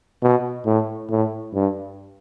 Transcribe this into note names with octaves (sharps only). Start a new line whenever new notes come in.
B2
A2
A2
G2